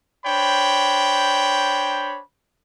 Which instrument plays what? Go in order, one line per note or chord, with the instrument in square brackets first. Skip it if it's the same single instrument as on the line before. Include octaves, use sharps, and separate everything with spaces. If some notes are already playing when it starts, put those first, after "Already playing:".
[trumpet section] D4 C5 C#5 G5 B5